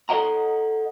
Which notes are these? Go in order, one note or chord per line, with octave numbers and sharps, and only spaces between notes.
A4 A#4 D#5 F#5 A#5